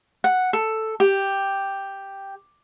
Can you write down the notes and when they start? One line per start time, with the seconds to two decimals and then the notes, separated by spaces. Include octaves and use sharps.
0.24 F#5
0.53 A4
1.00 G4